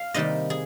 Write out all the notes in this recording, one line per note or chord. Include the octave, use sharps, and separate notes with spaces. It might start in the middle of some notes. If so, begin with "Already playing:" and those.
Already playing: F5
C3 D#3 G3 A#3 D#5
G#4